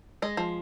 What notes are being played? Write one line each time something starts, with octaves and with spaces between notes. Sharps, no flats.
G#3 D#5
F3